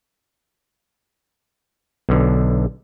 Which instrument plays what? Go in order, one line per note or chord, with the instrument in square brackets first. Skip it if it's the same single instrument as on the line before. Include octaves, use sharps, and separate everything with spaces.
[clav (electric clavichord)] B1 D3